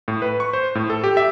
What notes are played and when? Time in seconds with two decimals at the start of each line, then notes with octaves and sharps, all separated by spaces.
0.08 A2
0.22 B4
0.40 C#6
0.53 C5
0.75 A2
0.90 A4
1.04 G4
1.17 E5